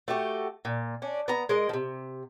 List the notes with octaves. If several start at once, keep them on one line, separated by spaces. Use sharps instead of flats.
A3 F#4 G4
A#2
C#4 D4
B3 A#5
G#3 A#4 D#5
C3 F3